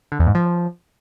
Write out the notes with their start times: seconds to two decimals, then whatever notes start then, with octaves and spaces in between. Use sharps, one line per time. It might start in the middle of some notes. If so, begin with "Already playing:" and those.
0.12 D3
0.19 E2
0.27 G#2
0.35 F3